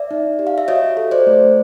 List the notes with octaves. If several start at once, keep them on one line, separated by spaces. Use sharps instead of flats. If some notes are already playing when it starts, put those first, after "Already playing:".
Already playing: D5 E5
D#4
G4
F5
E5
F#4 C#5 D#5
A4
C5 D5
A3